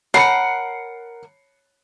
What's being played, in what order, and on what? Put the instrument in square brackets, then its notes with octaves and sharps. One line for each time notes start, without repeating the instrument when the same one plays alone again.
[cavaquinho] A#4 F#5 [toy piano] C#5 A5 B5 [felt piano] C7 C#7